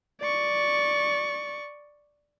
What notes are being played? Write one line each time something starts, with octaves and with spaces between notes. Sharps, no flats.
D5 C#6